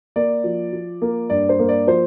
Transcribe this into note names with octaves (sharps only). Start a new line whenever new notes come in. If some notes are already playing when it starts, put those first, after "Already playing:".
A#3 D5
F3
F3
A#3
G2 D5
C5
A#3
D5
F3 C5